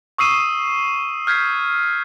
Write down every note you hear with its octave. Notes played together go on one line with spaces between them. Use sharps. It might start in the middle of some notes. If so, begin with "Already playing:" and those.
C#6 D#6 E6 C7 D#7 E7
F6 G6 G#6 B6 C7